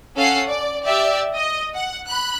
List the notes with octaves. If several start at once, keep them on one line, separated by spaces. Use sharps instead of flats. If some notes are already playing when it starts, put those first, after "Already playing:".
C#4 A4 F5 F#5 C7
D5
G4 D5 E5
D#5
F#5
B5 F#6